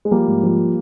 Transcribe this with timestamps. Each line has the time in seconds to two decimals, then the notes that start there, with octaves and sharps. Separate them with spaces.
0.05 G#3
0.11 F3 G3 A#3
0.27 G#2
0.43 F3